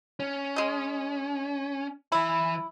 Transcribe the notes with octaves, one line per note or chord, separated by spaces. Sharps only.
C#4
G#3 D#5
E3 E4 B5